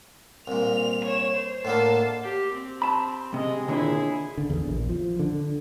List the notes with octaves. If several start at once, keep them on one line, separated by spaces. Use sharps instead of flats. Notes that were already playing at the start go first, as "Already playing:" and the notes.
C2 A#2 F7
C#5 E7
C5
A2 D3 A#3 A5 C7
G4
C4
A5 B5
C3 G#3 D#5
D#2 A#2 D3 E4 G#4
D3
E2
A#1
F3
D3